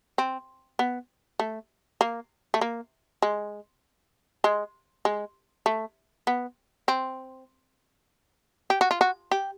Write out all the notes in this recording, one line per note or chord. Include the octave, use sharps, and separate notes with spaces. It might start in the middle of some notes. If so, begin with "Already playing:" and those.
C4
B3
A3
A#3
A3
A#3
G#3
G#3
G#3
A3
B3
C4
G4
F#4
F4
F#4
G4